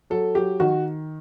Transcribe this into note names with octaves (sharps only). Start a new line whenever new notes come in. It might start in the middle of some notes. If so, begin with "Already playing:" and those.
F#3 A4
F#3 G4
D#3 F#4